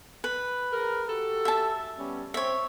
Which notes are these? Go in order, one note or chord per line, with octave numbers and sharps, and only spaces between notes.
B4
G#4 A#4
F#4 G4 A4
E5 A5
G3 B3 C#4
C4 C#5 E5